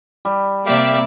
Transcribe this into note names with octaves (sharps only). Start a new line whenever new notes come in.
G3
C3 A#3 G4 D5 E5 F5